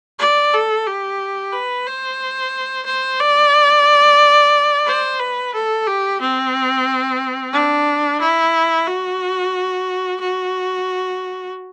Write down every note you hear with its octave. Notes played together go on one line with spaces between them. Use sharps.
D5
A4
G4
B4
C5
C5
D5
C5
B4
A4
G4
C4
D4
E4
F#4
F#4